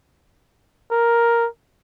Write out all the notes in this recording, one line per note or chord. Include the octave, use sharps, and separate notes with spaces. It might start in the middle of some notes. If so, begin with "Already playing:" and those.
A#4